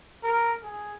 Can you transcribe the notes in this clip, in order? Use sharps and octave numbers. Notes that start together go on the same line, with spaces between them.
A#4
G#4